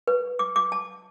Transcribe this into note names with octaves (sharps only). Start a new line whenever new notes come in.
B4
D6
D6
A5